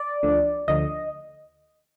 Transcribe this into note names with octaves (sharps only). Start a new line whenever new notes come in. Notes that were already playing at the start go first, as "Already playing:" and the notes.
Already playing: D5
D2 D3 F3
D2 D3 F3 D#5